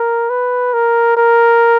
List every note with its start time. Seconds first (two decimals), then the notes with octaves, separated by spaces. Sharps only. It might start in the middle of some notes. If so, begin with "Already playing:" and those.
Already playing: A#4
0.30 B4
0.73 A#4
1.17 A#4